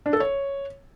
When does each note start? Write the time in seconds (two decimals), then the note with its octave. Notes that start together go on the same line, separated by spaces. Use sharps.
0.06 D4
0.13 A4
0.20 C#5